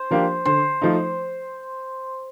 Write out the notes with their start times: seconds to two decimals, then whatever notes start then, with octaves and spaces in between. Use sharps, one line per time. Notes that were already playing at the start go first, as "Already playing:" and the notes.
Already playing: C5
0.11 F3 A#3 D4 G4
0.45 D3 C5
0.82 F3 A3 D#4